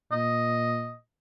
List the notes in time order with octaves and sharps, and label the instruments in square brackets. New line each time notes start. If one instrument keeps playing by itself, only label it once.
[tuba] A#2 [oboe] D#5